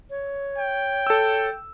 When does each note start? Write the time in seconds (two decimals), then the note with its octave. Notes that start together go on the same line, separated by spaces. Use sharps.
0.10 C#5
0.58 G5
1.07 A4 E6